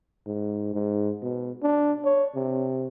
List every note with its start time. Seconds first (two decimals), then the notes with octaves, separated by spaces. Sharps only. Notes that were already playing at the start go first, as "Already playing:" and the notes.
0.27 G#2
0.74 G#2
1.22 B2
1.63 D4
2.05 C#5
2.35 C3